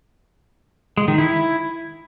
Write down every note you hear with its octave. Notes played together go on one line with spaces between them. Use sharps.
G#3
D#3
E4